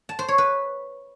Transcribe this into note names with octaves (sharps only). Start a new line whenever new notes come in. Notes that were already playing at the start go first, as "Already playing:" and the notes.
A5
C5
C#5
B4